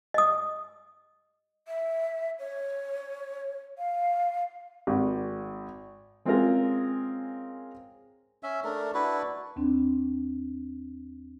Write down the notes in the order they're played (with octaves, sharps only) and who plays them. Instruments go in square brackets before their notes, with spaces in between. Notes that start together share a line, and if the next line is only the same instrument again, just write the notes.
[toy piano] D#5 D#6
[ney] E5
C#5
F5
[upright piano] G#1
[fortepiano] G#3 C4 C#4 F4 G#4 A#4
[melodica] C#4 E5
A3 D4 A#4
D4 E4 F#4 B4
[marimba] D#2 C4 D4